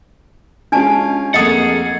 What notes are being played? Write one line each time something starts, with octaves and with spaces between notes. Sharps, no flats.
G#3 C#4 D4 F4 G#5 A5
F2 A3 A#3 G#4 D#5 F#5 D#6